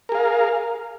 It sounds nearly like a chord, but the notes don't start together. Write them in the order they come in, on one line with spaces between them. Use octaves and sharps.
A#4 G#4 F5